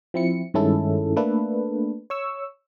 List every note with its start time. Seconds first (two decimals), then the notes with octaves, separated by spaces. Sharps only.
0.14 F3 C4 E4 C#7
0.54 G2 D#3 G#3 C#4 E4 A4
1.17 A3 A#3 D4 A4 B4
2.10 C#5 C#6 E6